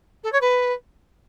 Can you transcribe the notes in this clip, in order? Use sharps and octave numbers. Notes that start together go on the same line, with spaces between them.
A4
C#5
B4